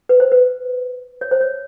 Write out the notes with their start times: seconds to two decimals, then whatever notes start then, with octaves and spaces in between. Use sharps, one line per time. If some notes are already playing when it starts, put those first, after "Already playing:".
0.09 B4
0.20 C5
0.32 B4
1.21 C#5
1.31 C5
1.41 C#5